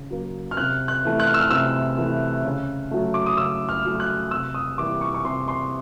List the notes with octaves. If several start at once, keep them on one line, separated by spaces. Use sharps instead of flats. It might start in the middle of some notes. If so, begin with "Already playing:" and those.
Already playing: C#3
F#3 A#3
F6
C3 F#6
F#6
E3 A3
F#6
F6
E6
F6
C3 E6
E3 A3
C#3
F#3 A3
D6
D#6
C#3 E6
F6
F#3 A3
F6
F#6
C3 E6
D#6
E3 G3 A#3 D6
C#6
C#6
C3 C6
C6